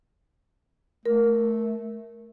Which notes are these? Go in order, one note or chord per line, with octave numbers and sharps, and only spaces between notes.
A3 A#4